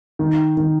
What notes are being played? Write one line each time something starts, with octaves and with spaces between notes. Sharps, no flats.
D#3
D#3